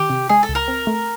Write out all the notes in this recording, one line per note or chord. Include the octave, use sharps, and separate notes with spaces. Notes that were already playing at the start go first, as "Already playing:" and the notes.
Already playing: D#3 G4
C3
G#3 G#4
A4
C#2
A#4
C4
A3